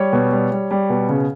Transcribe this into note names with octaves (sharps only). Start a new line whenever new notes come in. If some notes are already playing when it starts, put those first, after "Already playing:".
Already playing: G3 C#5
B2
G3
G3
G3
B2
C#3